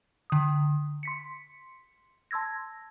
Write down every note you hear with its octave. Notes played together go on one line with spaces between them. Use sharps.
D3 D#6
C6 B6 C#7
A5 C6 E6 G#6 A#6